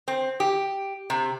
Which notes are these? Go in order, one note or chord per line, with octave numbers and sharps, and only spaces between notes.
C4
G4
C3